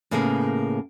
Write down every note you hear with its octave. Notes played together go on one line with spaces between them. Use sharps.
A2 C#3 A#3 B3 G#4 A#4